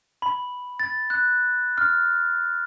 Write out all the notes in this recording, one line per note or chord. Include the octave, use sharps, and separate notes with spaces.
B5
A6
F#6
F6